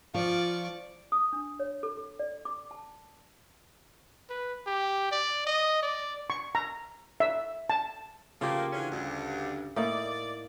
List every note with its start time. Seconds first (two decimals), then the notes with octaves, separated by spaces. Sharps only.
0.14 F3 F4 D5 C#6
1.12 D#6
1.33 D4
1.60 C#5
1.83 A4
1.97 A4
2.19 D5
2.45 D6
2.71 A5
4.30 B4
4.66 G4
5.11 D5
5.47 D#5
5.83 D5
6.30 C#6
6.55 A#5
7.20 E5
7.70 A5
8.41 C#3 F3 A3 A#3 F4 G4
8.72 D3 E3 C#4
8.91 D2 G2
9.76 A2 A#3 D#4 D5